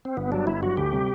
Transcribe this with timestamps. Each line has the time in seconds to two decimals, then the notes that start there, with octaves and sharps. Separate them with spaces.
0.05 C4
0.17 G1 B3
0.32 G2 F#3 D4
0.47 G1 E4
0.62 G2 F#3 F#4
0.77 D2 G4
0.93 C3 G3